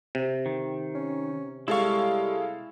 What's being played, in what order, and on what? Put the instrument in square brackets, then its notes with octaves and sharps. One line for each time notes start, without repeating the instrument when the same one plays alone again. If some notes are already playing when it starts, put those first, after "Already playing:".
[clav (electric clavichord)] C3
[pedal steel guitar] D#3
[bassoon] C#4
[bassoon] G3 [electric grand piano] G#3 A4 F5 [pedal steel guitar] E4 C#6